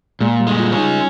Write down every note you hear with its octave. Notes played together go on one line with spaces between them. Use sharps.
A#2 G#3
G3
G#3
F4
C#4
D#4